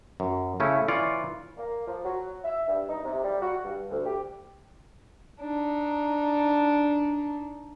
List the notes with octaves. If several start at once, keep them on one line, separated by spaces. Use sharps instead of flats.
F#2
C#3 A3 C#4 E4
E3 F4 C#5 D5
A#3
F3
F#3
E5
G2
D#4
C3
G3
F#4
G2
D2
G4
D4 D#4